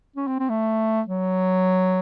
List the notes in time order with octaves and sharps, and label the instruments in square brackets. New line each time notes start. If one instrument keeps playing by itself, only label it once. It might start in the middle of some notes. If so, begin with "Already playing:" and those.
[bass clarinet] C#4
C4
C4
A3
F#3